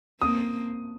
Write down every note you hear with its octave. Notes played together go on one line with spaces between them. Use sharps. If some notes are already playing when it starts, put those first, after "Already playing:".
A#3 C4 D#6